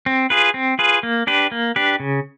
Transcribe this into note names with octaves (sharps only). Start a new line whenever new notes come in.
C4
F4 G#4 B4
C4
F4 G#4 B4
A#3
D4 G4 B4
A#3
D4 G4 B4
C#3